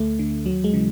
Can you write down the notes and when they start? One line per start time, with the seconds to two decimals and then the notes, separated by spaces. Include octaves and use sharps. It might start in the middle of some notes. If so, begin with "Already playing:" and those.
Already playing: D2 A3
0.19 D3
0.46 D#2 F#3
0.64 G#3
0.74 C#3 E3